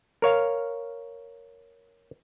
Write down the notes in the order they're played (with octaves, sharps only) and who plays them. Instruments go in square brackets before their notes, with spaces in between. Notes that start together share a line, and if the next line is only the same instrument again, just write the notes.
[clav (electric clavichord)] A#4 C#5 F5